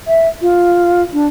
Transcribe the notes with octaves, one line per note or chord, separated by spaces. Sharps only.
E5
F4
D4